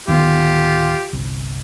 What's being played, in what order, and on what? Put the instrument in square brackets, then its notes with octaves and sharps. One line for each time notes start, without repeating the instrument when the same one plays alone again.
[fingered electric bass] D1 D#3 B3 [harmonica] F4 G4
[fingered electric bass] G1 C2